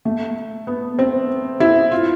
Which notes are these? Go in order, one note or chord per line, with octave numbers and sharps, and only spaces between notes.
A3
B3
C4
E4
F4